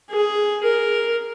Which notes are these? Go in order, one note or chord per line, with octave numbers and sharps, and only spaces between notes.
G#4
A#4